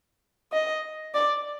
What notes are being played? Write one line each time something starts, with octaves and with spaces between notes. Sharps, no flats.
D#5
D5